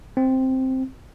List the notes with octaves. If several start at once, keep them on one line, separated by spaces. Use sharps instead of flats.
C4